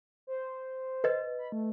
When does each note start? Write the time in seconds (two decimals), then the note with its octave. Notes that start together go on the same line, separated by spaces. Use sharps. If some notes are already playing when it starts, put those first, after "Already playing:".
0.27 C5
1.04 B4 D#5
1.39 B5
1.52 A3